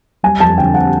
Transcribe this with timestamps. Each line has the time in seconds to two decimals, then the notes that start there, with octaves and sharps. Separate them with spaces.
0.23 G3 G#5
0.40 F2 A5
0.58 D3 G5
0.74 C4 F#5